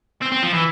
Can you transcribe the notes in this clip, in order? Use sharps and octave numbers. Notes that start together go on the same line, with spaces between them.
C4
C4
F3
E3